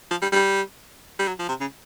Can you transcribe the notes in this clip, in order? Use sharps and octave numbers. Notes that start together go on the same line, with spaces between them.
F3
G3
G3
G3
F#3
F3
C3
C#3